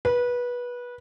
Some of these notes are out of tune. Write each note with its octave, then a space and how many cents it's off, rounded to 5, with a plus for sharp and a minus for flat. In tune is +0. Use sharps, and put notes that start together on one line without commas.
B4 -20